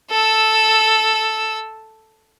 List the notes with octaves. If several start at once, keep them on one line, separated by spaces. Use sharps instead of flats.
A4 E6